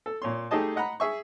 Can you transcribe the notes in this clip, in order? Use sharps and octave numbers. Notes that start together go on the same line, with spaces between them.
A4
A#2 C#5 C6
A3 D#4 G4 G#4 D#5 A5
D#5 F#5 A#5 B5
G#4 E5 C#6